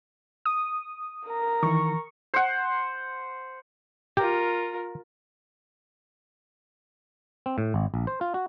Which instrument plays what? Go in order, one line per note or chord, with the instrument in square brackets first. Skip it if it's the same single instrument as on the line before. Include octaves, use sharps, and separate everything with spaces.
[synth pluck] D#6
[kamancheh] A#4 A#5
[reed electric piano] D#3 E3 [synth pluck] C#6
[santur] C5 F#5
[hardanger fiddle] F4 A#4 [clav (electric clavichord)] G4
[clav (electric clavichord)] C4
A2
G#1
A#1
C5
F4
F#4